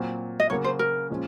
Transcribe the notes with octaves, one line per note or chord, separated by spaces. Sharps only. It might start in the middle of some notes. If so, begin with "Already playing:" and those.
Already playing: A#2 F#3 C4
D#5
C#3 F#3 A#3 C#5
C5
A#4
A#2 F3 G#3 C#4